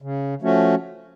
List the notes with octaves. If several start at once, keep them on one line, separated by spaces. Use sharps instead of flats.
C#3
F3 A3 C#4 F#4